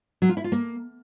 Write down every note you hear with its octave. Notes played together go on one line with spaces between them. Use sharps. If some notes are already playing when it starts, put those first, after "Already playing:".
F#3
F4
E4
F4
A#3